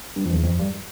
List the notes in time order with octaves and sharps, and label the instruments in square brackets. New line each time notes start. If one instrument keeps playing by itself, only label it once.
[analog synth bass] G2
F2
E2
F2
G2